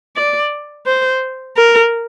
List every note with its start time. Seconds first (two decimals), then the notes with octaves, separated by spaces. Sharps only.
0.16 D5
0.86 C5
1.57 A#4